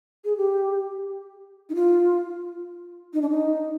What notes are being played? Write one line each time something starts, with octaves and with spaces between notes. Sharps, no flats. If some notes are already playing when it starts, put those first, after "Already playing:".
G#4
G4
D#4
F4
D#4
D4
D#4